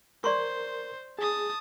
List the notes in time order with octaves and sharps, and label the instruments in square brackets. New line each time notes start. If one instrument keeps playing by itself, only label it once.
[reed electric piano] A#4 [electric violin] C5 [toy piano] D5 C6 C#6
[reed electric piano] G#4 [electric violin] A5 D#6